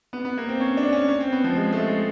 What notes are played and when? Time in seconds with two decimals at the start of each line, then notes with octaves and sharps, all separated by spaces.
0.13 B3
0.25 B3
0.38 A#3
0.49 C4
0.60 C#4
0.77 D4
0.93 C#4
1.09 C#4
1.20 C4
1.32 B3
1.44 F3
1.56 G#3
1.73 A3
1.88 G#3